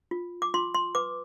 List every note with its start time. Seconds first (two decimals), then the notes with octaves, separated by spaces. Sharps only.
0.11 F4
0.42 D6
0.54 F4 C6
0.74 C6
0.95 B4 D6